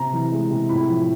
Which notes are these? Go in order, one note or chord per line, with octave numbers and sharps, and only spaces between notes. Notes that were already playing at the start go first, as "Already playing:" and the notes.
Already playing: C3 A#5
E3
G#3
C3
A2 B5
F3